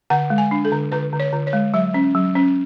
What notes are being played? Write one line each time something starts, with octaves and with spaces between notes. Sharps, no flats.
D3 F#5
G#3
G#5
D4
A4
D3
D3 B4
D3
C#5
D3
C#5
G#3
F#3 E5
C#4
F#3
C#4